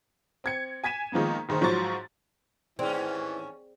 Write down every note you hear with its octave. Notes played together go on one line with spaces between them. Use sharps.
C4 G#6 C#7
G#5 G#6 B6 D#7 E7
D#3 F3 G#3 A#3 B3
F#1 D#3 G#4 C5
G#2 F3 F#3 C5 C#6 A6
D#2 G#2 E3 C4 C#4 G#4 D5 G5